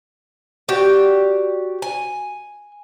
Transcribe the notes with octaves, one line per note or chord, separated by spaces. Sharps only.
F#4 G4 D5
G#5